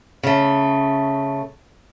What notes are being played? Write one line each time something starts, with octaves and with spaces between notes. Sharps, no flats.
C#3 A3